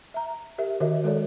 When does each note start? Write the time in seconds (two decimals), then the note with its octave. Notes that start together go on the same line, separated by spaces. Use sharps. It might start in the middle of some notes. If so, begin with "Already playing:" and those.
0.14 E5 A#5
0.58 G4 A#4 E5
0.80 D#3 F#4 A#4 D#5 E5
1.04 G#3 F#4 A4 A#4 C#5 D5